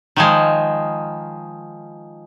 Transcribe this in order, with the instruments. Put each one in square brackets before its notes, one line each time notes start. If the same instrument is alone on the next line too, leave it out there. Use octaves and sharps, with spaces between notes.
[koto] D#3 F3 G#3